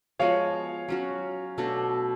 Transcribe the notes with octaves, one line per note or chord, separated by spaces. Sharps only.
F3 G#3 B3 F#4 C#5 F5
F#3 C#4 F#4
B2 A3 D4 F#4